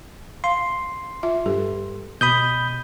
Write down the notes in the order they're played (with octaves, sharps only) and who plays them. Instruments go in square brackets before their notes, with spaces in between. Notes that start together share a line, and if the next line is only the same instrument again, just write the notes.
[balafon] F5 [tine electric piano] C6
[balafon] F4 E5
[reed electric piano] G2 [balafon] G4 A4
[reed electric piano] B2 [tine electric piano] B5 D#6 G6